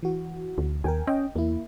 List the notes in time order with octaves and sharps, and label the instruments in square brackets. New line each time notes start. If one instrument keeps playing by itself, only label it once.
[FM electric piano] E3 F#4
[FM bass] D2
[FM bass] D#2 [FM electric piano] A#4 G5 G#5
[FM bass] C#4 [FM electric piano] D#5 G5
[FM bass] E2 [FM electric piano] A#3 E4